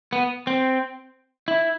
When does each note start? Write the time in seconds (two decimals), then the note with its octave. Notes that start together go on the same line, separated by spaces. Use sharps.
0.13 B3
0.47 C4
1.48 E4